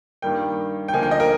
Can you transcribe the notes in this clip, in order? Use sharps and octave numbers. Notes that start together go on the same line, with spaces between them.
G2 D#3 G3 A#3 G5
G5
D2 D3 F3 A#3 D#4 G#5
G5
D#5
A#4